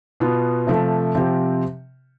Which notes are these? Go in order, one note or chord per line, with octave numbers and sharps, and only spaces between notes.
B2 B3 F4
C3 F3 A3
C3 F3 C4 G4